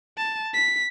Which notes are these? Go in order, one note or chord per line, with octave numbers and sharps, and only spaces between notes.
A5
B6